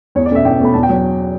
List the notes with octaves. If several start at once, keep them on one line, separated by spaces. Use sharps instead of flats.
E2 C#5
D5
B2 A3 C#4 E5
E2 G5
B2 A3 C#4 B5
E2 A5
G5
F#3